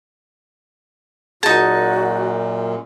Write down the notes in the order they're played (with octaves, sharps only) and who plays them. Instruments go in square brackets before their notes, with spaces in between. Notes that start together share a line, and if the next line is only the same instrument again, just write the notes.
[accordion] F#2 A#2 [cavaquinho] D#4 A5 [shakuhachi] F#4 [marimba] G#4